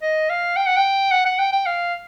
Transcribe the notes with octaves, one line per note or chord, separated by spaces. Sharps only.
D#5
F5
G5
F#5
G5
F#5
F#5
G5
G5
F5